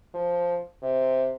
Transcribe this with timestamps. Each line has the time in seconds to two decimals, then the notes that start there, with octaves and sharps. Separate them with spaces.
0.14 F3
0.82 C3